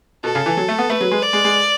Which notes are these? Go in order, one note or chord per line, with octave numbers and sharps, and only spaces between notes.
B2 A4
C#3
E3
F#3
A3
B3
A3 B4
F#3
G#3
D5
G#3
G#3